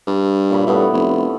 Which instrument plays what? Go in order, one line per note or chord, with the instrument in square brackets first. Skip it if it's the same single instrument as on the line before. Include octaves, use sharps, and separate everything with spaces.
[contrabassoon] G2
[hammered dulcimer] A#2 C#5 B5
[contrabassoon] G2 [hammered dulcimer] A3 B3 E4
[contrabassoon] F1